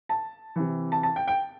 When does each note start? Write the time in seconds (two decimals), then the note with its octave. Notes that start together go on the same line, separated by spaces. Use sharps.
0.09 A5
0.56 C3 E3
0.92 A5
1.03 A5
1.16 G5
1.28 G5